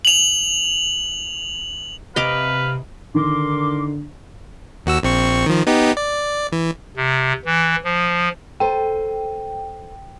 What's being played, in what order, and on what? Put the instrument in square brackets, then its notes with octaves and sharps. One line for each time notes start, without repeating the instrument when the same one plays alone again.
[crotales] F7 F#7
[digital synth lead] C3 [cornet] B4 [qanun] D#5 A#5 D6 [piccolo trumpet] F5
[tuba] D3 [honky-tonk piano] D#3 [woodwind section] A#4 C6 D6
[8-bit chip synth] D#2 F#4 E6
A#1 C4 C#6
D#3 F3
B3 D#4 G4
D5
E3
[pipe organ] C3
E3
F3
[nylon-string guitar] A4 C5 [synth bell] G5